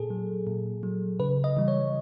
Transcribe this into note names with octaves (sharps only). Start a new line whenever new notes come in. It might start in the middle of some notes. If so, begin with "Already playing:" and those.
Already playing: A#2 G#4 A4
F#3
A#2
F#3
C#3 B4
D#5
E3 G3
C#5